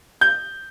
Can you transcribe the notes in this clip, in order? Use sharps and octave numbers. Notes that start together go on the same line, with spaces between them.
G6